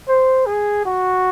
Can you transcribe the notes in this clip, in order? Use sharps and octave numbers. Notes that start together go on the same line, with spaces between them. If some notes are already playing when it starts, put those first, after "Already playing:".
C5
G#4
F#4